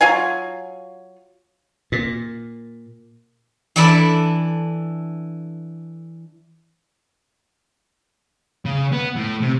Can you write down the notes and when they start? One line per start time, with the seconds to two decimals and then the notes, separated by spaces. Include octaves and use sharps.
0.01 F#3 F4 F5 G#5
1.92 A#2
3.76 E3 D4 A4 D5 B5
8.65 C#3
8.92 B3
9.16 A2
9.41 C3